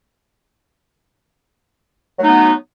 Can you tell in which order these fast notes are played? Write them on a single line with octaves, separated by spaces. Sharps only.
F#3 A3 D#4 B3